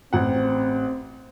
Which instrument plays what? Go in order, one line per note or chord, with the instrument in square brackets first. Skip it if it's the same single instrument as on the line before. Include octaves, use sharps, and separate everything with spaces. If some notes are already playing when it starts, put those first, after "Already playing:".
[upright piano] A1 F#5 [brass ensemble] C4